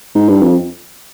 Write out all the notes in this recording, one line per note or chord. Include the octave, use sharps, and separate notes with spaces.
G#2
G2
F2